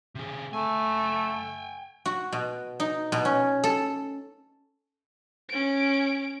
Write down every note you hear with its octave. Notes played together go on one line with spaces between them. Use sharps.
C3 G#4
A3 G5 G#5
F#4
B2
D#4
B2
C#4
A4
C#4 D7